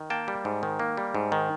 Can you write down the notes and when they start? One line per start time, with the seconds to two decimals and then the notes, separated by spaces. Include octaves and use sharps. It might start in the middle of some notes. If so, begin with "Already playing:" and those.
Already playing: D#3
0.10 A#3 G5 A5
0.28 G3
0.45 G#2
0.63 D#3
0.80 A#3
0.97 G3
1.15 G#2
1.32 D#3